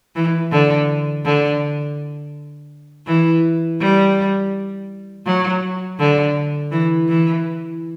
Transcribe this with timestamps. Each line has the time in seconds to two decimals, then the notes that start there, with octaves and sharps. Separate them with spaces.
0.16 E3
0.52 D3
1.25 D3
3.07 E3
3.80 G3
5.26 F#3
5.99 D3
6.71 E3
7.08 E3